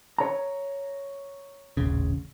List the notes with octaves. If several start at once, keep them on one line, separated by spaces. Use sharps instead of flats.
C#5 A#5
D#1 A1 C#3